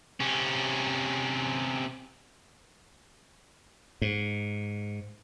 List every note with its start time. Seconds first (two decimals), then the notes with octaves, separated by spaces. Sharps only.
0.20 C3 C#4
4.02 G#2